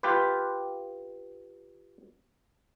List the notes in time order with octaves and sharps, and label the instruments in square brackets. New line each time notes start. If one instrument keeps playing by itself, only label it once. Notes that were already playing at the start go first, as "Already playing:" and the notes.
[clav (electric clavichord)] F4 G4 B4